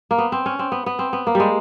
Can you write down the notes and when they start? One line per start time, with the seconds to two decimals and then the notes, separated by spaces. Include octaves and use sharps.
0.11 A#3
0.18 B3
0.32 C4
0.46 C#4
0.59 C4
0.72 B3
0.86 B3
0.99 C4
1.13 B3
1.27 A#3
1.35 G3 G#3